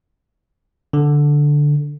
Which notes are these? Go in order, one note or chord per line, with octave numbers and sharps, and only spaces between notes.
D3